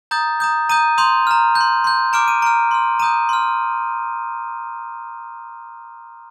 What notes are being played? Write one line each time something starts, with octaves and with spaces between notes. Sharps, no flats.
A#5 D#6 G6 A6
A#5 D#6 G6
A#5 D#6 G6 D#7
C6 D#6 G6 F7
A#5 F6
G6
C6
C6 G6
A#5 D6 F6 D7
D#7
A#5 F6 D7
C6 F6
A#5 D#6 G6 D#7
C6 F6